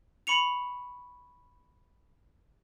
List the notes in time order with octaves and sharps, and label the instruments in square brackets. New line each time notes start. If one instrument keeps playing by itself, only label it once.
[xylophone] B5 C#6 C#7 F7